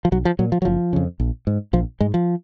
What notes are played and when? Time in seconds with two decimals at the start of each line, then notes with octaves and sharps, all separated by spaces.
0.05 F3
0.12 B1 F#3
0.25 F3
0.39 A#2 F#3
0.52 F3
0.62 F#3
0.65 F#1 F3
0.93 F2 C#3
1.20 A#1
1.47 G#2
1.73 A#1 F3
2.00 G#2 G#3
2.14 F3